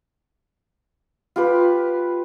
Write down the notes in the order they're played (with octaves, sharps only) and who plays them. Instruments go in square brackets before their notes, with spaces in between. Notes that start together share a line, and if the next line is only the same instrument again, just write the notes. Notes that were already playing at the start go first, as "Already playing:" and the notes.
[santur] F4 G4 B4